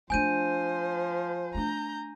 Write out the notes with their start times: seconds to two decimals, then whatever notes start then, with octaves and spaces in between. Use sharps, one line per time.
0.10 F3 A3 D4 C5 G#5 G6 D#7
1.55 A3 D4 A#5 G6